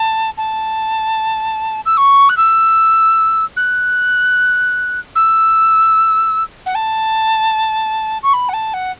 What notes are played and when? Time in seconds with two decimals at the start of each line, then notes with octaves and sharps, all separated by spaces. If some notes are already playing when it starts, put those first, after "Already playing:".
Already playing: A5
0.37 A5
1.86 E6
1.97 C#6
2.29 F#6
2.37 E6
3.56 F#6
5.15 E6
6.66 F#5
6.75 A5
8.23 C#6
8.33 B5
8.49 F#5
8.53 A5
8.74 F#5